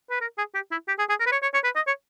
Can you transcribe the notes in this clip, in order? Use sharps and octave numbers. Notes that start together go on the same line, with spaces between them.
B4
A#4
G#4
G4
E4
G4
G#4
G#4
A#4
B4
C#5
C#5
C#5
B4
D#5
C#5